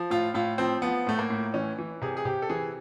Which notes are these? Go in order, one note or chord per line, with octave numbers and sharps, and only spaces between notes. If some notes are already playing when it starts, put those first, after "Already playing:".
Already playing: F3
A2 F4
A2 F4
F3 C4
F3 B3
A2 A3
A#3
A2
E3 C#4
E3
C3 G#4
G#4
C3 G4
A4
E3 G#4